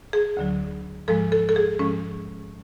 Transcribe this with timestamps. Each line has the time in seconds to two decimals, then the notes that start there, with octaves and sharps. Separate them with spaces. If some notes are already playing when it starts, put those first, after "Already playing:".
0.13 G#4
0.37 D2 D3 F#3
1.08 G#2 F3 G#3 A4
1.32 A4
1.49 A4
1.56 G#4
1.79 G#2 F3 G#3 C#4